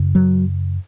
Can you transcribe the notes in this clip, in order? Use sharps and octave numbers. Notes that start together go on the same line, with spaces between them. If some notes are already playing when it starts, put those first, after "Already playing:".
Already playing: F#2 C#3
F#3